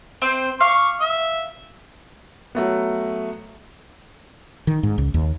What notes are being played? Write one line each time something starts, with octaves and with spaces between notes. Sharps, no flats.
C4 C5
F5 C#6 D6
E5
F#3 A3 B3
D#3
G#2
C#2
D#2